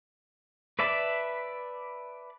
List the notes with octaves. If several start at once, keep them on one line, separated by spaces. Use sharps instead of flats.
B4 D5 E5 A5 B5